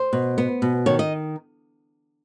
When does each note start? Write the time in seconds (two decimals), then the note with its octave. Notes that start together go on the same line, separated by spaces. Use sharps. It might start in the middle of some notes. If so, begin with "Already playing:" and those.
Already playing: C5
0.13 B2
0.38 B3
0.62 B2
0.86 D#3 C#5
0.99 D#5